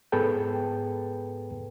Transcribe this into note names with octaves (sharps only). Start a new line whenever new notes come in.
G#2 B3 G#4 A4 B4 G5